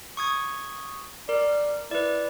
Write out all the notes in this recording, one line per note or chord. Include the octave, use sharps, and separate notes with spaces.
C#6 D#6 G#6
A#4 D5
E4 B4 D5